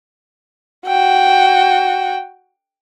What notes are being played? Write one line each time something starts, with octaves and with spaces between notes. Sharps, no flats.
F#4 G5